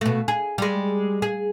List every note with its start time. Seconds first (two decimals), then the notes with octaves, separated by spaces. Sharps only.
0.01 B2 A3
0.28 G#4
0.58 G3 G#3
1.22 G#4